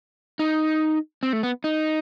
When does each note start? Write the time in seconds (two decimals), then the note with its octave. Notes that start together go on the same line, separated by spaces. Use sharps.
0.39 D#4
1.23 C4
1.33 A3
1.43 B3
1.64 D#4